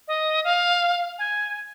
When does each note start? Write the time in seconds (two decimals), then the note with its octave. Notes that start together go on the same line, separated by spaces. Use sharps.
0.07 D#5
0.44 F5
1.18 G#5